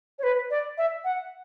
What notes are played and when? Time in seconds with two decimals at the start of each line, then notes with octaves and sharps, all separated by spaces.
0.19 C#5
0.23 B4
0.50 D5
0.78 E5
1.05 F#5